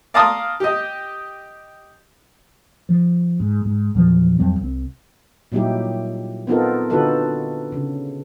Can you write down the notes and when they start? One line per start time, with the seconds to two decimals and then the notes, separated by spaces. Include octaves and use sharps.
0.14 D5 F5 A5 A#5 C6 D#6
0.60 G4 D#5
2.89 F3
3.40 G#2
3.65 G#2
3.95 E2 A#2 F3 F#3
4.38 F2 F#3 G3 C4
4.61 C2 C4
5.52 A#2 F#3 G3 D#4 E4 G4
6.47 B3 C4 D#4 F4 A4 A#4
6.90 D3 D#4 F4 F#4 A4 B4
7.72 C#3